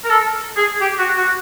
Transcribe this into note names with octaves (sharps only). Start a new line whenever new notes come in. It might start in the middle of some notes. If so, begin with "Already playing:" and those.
A#4
A4
G#4
G4
F#4
F#4